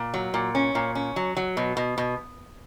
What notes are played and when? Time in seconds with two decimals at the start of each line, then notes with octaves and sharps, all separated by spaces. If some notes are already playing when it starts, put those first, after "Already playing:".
Already playing: A#2
0.14 F#3
0.34 A#2
0.55 C#4
0.75 A#2
0.95 C#4
1.16 F#3
1.37 F#3
1.57 B2
1.77 B2
1.98 B2